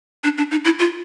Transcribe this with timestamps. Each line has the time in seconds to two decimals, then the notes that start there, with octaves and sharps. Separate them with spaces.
0.24 D4
0.38 D4
0.51 D#4
0.65 E4
0.79 F4